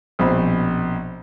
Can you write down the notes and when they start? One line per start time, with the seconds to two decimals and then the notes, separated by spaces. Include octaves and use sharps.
0.19 A#1 B2 C4 B5